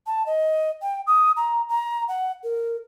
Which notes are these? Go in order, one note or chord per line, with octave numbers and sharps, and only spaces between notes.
A5
D#5
G5
D#6
A#5
A#5
F#5
A#4